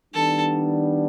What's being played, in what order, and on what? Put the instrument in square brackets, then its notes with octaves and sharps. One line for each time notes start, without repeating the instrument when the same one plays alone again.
[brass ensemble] D#3 G3 B3 D4 [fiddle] A4